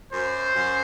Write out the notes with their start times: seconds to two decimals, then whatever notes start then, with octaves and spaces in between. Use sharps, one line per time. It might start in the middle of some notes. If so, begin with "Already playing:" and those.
0.12 F#2 C5
0.55 F#2